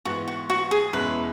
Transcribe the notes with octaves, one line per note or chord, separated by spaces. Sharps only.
G#2 E3 B3 F#4
F#4
F#4
G#4
E2 B2 G#3 C#4 E4 B4